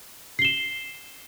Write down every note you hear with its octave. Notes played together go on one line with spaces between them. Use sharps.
C7 E7 G7